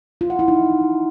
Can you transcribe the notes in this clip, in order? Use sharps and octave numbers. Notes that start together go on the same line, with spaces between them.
F4
F#5
E4
D#4